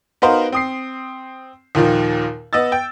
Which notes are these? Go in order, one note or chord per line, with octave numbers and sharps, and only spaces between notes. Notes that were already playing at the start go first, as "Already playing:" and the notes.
B3 D#4 F#4 A#4 C5 F5
C4 D#6 C7
D#2 A#2 D#3 F3
B3 D#5 E6 A6
G5